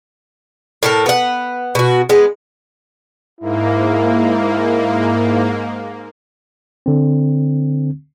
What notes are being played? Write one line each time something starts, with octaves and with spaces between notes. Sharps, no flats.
A2 A4 A#4
B3 F#5
B2 F#4
G#3 B3
G#2 A#3 E4
D3 C4